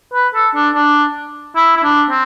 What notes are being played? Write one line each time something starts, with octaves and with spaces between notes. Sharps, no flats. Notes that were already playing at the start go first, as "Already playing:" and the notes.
B4
A4
D4
D4
E4
E4
D4
C4